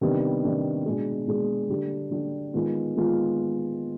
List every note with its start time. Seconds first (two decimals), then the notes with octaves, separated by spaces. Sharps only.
0.01 C3 D#3 G3 B3 D4
0.43 C3 D#3 G3 B3 D4
0.85 B2 G#3 D4 G#4
1.27 B2 G#3 D4 G#4
1.69 D3 G3 D4 G4
2.11 D3 G3 D4 G4
2.54 D#3 G#3 B3 F4
2.96 D#3 G#3 B3 F4